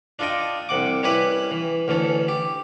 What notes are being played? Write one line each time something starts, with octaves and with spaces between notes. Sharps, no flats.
D4 F4 A4 D#5 G5
C2 C3 F#5 D6
G3 C#4 E4 G4 B4 E5
E3
D2 E3 C#4 A4
G4